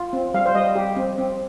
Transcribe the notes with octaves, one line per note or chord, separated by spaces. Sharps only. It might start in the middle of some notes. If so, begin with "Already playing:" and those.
Already playing: F4
C4
G3 F5
C5
G3 D#5
G4
C4
C4